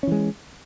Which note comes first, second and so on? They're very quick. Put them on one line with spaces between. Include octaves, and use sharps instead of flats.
C#4 E3 G#3